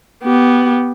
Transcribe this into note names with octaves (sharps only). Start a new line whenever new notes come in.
B3 G4